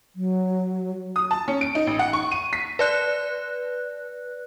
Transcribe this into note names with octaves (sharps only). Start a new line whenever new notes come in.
F#3
D#6
A5
C#4
D7
D#4
A1
F#5
C#6
D#7
B6
B4 D5 F#6